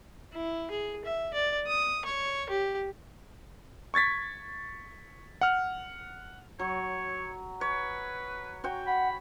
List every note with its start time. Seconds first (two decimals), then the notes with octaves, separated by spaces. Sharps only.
0.33 E4
0.70 G#4
1.05 E5
1.34 D5
1.67 D#6
2.05 C#5
2.49 G4
3.94 C#6 G#6 A6 B6
5.41 F#5 F6
6.59 F#3 C#5
7.61 B4 C#5
8.64 F#4 C#5 G5
8.87 F#5 B5